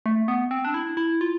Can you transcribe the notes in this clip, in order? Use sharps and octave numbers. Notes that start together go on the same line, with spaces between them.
A3
B3
C4
D4
E4
E4
F4